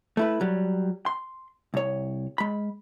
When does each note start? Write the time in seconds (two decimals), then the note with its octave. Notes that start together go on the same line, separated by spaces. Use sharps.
0.17 A3 E4 B4
0.41 F#3 G3
1.06 C6
1.74 C2 C#5
2.38 G#3 B5